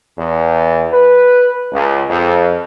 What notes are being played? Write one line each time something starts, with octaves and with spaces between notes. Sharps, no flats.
E2
B4
C#2
F2